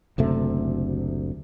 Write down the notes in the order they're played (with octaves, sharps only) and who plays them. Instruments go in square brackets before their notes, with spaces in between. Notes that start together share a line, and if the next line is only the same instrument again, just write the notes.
[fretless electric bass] F#1 D2 C3 A3